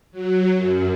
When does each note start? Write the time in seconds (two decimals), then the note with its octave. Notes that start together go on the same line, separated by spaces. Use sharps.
0.12 F#3
0.54 F#2